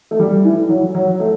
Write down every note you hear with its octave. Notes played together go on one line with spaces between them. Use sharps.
A3
G3
E3
F#3
F#3
A3